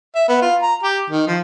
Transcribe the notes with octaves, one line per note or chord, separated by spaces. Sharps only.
E5
B3
F4
A#5
G4
D#3
F3